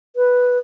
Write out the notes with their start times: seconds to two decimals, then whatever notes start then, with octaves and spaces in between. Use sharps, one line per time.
0.16 B4